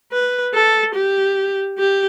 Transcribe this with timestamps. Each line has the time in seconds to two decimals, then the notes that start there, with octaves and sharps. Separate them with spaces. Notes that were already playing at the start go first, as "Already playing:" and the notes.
0.12 B4
0.54 A4
0.95 G4
1.78 G4